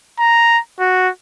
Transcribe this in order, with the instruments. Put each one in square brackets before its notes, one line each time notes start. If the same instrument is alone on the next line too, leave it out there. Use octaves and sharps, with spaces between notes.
[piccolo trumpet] A#5
F#4